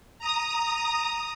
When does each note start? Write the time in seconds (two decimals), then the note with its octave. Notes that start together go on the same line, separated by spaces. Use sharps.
0.19 A#5 D#6